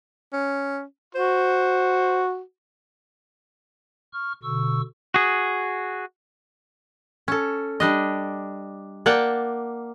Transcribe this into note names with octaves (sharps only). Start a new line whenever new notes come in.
C#4
F#4 C5
C#6 F6
B2 D3 C#6 E6
F#4 G#4
C#4 A4
G3 D4 D#5
A#3 D5 F#5 G5 A5